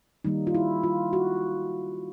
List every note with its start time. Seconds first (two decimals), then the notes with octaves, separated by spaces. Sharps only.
0.25 D#3 G3 A#3 D#4
0.47 F4
0.55 E4
0.83 F4
1.13 F#4